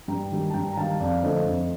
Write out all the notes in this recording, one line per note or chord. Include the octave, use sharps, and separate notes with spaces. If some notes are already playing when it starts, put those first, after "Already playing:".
G2 G5 A#5
D#3 G3
A5
G2 G5 A#5
A#5
D#3 G3 F5 A5
F2 D5 F5
D3 F3 A3 C5 D#5
F2